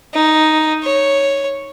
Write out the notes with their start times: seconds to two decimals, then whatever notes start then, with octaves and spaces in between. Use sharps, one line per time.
0.14 D#4
0.83 C#5